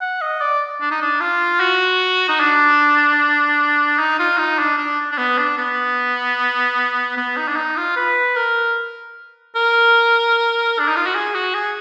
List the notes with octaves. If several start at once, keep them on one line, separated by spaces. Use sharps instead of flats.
F#5
D#5
D5
D4
D#4
D4
F4
F#4
D#4
D4
D#4
F4
D#4
D4
D4
D4
B3
D4
B3
B3
D#4
D4
D#4
F4
B4
A#4
A#4
D4
D#4
F4
F#4
G#4
F#4
G#4